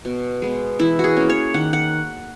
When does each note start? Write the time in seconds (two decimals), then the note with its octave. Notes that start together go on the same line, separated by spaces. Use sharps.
0.05 B2
0.42 G#3 B3
0.79 E3 E4
0.99 F#4 G#4
1.17 A#3 C#4
1.30 C#5
1.54 D#3 F#5
1.73 F#5